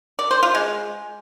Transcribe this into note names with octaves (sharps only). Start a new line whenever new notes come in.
D5
C5
F4
G#3